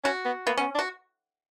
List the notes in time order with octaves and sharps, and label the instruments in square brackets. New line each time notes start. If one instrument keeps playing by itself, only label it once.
[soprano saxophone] C#4 [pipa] F#4
[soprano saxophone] B3
[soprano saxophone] A#3 [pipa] B3
[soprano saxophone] B3 [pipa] C#4
[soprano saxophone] D4
[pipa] F#4